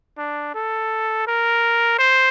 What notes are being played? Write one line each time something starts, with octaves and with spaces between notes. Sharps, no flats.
D4
A4
A#4
C5